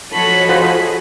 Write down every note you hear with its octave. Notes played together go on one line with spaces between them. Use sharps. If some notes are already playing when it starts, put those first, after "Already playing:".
F3 F#4 A4 C#5 D#5 B5
F4 G#4 A4 C5 F#5